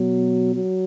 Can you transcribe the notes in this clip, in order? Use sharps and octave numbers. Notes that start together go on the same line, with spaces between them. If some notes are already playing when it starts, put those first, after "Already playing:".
Already playing: B2 F#3
F#3